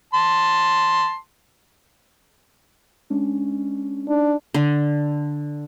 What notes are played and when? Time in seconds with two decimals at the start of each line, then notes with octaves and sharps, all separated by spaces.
0.14 A5 C6
3.10 G#3 C#4 D4
4.09 D4 D#4
4.54 D3